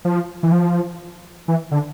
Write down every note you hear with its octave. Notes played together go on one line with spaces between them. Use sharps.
F3
E3
F3
E3
D3